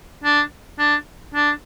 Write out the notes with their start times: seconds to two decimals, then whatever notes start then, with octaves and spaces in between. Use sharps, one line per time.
0.24 D4
0.79 D4
1.34 D4